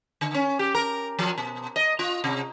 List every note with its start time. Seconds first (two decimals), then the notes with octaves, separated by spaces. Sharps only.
0.21 D3
0.34 C#4
0.59 G4
0.75 A#4
1.19 F3
1.38 B2
1.76 D#5
1.99 F4
2.24 C3